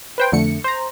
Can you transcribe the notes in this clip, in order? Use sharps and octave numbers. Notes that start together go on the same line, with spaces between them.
B4 C5 G5
F2 D3 A3 C#7
C5 A#5